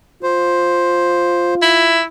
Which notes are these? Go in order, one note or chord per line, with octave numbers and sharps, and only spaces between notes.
F4 C5
E4